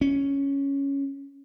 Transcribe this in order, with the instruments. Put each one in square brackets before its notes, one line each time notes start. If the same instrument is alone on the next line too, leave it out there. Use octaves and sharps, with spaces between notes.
[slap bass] C#4